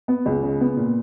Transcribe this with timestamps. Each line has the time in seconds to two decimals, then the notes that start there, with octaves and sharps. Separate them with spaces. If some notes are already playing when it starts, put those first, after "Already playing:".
0.08 B3
0.26 C#2
0.43 C#3
0.61 B3
0.77 A#2